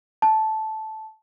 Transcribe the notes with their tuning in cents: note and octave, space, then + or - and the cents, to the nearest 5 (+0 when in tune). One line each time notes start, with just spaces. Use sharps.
A5 -10